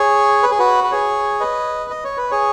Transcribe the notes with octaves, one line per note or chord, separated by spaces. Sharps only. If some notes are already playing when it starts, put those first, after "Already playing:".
Already playing: G#4 C#5
B4
G#4
F#4 B4
B4
G#4 C#5
B4 D#5
D#5
C#5
B4
G#4 C#5